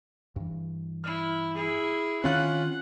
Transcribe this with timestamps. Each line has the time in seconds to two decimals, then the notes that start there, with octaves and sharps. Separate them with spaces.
0.36 G2 E3
1.04 E4 F6
1.54 E4 G#4
2.24 D#3 C4 C#4 F4 F#5 F#6